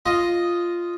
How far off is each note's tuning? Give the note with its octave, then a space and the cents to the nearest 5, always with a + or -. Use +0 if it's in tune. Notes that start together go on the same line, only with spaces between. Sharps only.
F4 -5 D#5 +0